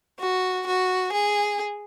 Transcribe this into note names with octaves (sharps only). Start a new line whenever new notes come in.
F#4
F#4
G#4